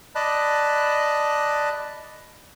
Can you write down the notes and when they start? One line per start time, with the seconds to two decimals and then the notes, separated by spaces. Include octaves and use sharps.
0.15 D5 D#5 A5 B5 F#6